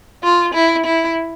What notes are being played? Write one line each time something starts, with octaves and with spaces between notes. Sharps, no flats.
F4
E4
E4